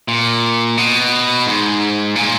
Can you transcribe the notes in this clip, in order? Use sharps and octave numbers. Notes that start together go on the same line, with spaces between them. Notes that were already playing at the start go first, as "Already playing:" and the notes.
A#2
B2
G#2
A#2